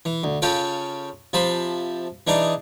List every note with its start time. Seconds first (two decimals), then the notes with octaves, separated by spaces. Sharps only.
0.05 E3
0.23 D2
0.42 C#3 C#4 F4 A4 G5
1.33 C3 F3 A5 B5 C6
2.27 E3 D4 D#4 G#4 D5